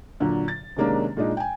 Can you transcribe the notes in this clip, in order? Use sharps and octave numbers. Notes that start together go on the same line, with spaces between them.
A#2 D3 F#3
A6
C3 D#3 G#3 A#3 C#4 D4
A#2 G#3 D4 D#4
G5 G#5